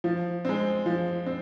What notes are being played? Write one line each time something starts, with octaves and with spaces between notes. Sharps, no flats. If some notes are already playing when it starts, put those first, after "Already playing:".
F3
G#3 C4
F3
C4